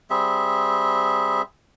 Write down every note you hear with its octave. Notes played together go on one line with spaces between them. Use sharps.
G3 C4 G#4 E5